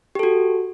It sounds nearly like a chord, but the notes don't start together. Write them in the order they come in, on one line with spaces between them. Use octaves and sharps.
G4 A4 F#4